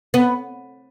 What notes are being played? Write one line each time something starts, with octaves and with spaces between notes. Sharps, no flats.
B3